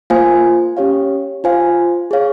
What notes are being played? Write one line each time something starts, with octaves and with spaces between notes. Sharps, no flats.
A#3 F4 C5 F5 G#5
C#4 G4 C#5 F5
F4 C5 F5 G#5
G#4 C#5 F5